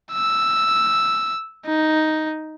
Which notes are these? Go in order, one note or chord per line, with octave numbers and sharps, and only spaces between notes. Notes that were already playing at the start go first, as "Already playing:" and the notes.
E6
D#4